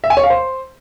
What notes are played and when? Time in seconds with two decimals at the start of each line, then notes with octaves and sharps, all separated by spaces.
0.04 E5
0.10 G#5
0.17 C#5
0.24 F5
0.30 C5